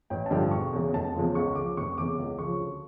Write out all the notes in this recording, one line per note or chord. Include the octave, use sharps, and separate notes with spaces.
A1 G5
A5
G2 D3 F3 G5
E1 C#6
E2 C#3 E3
F1 A5
E2 C#3 F3
C#2 C#6
C#3 F3 D6
F1 C#6
E2 C#3 E3 D6
C#2
C#3 F3 C#6
D2